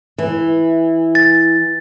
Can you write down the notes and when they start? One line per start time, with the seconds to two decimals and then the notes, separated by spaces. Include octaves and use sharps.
0.18 E3
1.15 A6